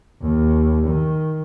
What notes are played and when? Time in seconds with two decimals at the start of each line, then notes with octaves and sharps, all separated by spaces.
0.21 D#2
0.88 D#3